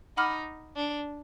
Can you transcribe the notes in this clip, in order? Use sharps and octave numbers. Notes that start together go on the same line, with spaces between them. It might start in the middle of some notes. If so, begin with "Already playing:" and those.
D#4 F#5 B5 D6 F6
D4